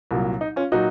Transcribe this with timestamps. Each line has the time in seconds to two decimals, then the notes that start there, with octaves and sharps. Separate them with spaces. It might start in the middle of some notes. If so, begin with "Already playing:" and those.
0.11 C2 A#2 F#3
0.41 D#4
0.56 C#4 F4
0.72 A#2 F#3 D#4 F#4